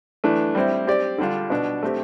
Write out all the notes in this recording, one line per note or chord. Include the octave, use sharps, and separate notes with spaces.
E3 A3 D4
G3 C4 E4
C4 G4 D5
D3 G3 D4 F4
B2 B3 D4
A3 C4 G4